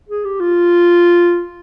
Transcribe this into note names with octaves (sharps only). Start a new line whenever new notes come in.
G#4
G4
F4